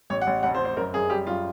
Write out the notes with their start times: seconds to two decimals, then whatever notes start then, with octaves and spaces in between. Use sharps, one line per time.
0.10 A1 C#5
0.21 F#5
0.27 A1
0.43 F1 F#5
0.54 C5
0.59 F1
0.65 C5
0.77 F#2 A#4
0.94 F#2 G#4
1.10 G3 G4
1.27 F#2 F4